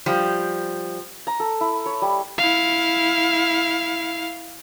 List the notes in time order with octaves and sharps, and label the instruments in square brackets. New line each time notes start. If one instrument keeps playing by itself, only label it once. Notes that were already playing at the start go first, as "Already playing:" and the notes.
[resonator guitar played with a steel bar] F3 G3
[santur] A#5
A4
E4
C#5
G3
[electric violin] E4 F5